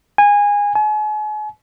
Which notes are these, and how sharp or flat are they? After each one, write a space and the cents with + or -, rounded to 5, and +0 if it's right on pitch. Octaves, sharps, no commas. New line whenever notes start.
G#5 -20
G#5 +40